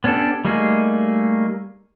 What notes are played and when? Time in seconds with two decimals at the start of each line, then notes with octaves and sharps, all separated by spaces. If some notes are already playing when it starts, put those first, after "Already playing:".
0.04 B3 C#4 D4 G4 A4
0.45 G3 A3 A#3 D#4 G#4